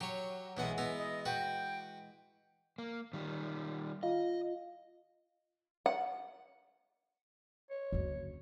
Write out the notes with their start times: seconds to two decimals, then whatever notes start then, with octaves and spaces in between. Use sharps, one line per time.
0.01 F#3 G4 C#5
0.57 B1 E3 G#3 B3 F#5
0.78 B3 E4 A#5
0.98 D#5
1.25 F#4 B4 G5
2.78 A#3
3.13 D#3 G3
4.03 F4 D#5 F5
5.86 F#5
7.71 C#5
7.92 F#1 D2